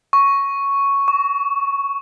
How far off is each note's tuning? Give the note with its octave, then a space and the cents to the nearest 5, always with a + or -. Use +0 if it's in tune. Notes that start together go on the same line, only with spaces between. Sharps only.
C#6 +0
C#6 +30